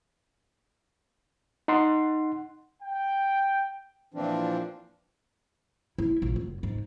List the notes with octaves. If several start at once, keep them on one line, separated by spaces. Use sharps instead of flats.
D#4 F#5 C6
G5
A#2 E3 F3 C4 D4
E4
A#1
F#1
G#2